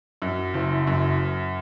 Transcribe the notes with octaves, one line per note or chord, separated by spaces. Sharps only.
F#2
F#1
F#2